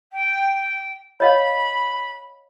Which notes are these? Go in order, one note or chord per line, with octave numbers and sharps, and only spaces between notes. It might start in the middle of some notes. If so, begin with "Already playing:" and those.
G5
C#5 D#5 F5 B5